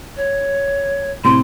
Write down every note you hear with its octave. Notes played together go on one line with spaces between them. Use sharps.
C#5
A2 C3 C4 E4 C6